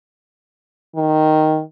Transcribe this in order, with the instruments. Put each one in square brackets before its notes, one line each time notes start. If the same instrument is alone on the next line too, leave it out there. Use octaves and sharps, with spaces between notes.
[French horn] D#3